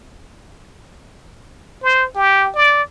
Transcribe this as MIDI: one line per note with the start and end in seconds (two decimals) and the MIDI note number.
1.83 2.06 72
2.15 2.49 67
2.55 2.82 74